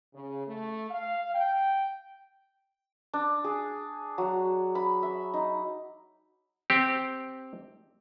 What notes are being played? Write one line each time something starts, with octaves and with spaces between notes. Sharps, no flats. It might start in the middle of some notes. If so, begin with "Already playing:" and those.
C#3
A3
F5
G5
D4
G#4
F#3
B5
E5
D#4
C4 G4